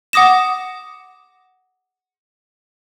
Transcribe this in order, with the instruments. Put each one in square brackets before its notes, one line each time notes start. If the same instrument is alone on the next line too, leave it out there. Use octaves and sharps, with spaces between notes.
[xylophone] F#5 D6 D#6 A#6 E7